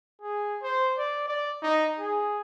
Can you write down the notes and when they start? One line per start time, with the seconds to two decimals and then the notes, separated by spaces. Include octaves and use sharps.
0.22 G#4
0.63 C5
0.98 D5
1.28 D5
1.63 D#4
1.99 G#4